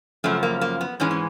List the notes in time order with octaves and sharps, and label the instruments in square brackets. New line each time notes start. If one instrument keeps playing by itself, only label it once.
[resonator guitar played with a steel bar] F#2 C#3 F3 A3
A#3
A#3
B3
G#2 E3 G#3 C#4
C#4